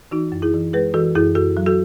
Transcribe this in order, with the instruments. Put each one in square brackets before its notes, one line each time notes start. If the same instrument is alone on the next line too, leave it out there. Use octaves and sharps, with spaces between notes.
[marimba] E3 D#4 F#4
F#2
E4 G#4
E3
G#3 G#4 B4
E3 F#4 A4
F#2 E4 G#4
F#2 F#4 A4
F#3
F#4 A4